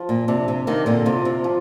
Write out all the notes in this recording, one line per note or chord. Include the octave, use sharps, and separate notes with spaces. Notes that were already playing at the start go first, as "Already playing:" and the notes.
Already playing: F3
A#2
C3 D4
C3
C3 D#3 A#3
A#2 D3
C3 F4
C3
F3